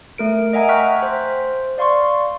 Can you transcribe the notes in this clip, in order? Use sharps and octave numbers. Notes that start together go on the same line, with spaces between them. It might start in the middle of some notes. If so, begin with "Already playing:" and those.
A3 A#4 D7
D#5 E5 F#5 G#5 A#5
G5 A#5 C#6 F6 F#6 B6
C5
D5 F5 C6 C#6